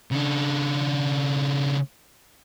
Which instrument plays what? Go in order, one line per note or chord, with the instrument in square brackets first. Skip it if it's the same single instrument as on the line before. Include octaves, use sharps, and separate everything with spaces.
[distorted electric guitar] C#3 D4